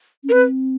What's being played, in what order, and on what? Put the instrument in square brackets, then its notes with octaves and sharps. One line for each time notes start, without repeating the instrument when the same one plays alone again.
[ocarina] C#4
[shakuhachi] A#4
[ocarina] C4 [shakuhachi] B4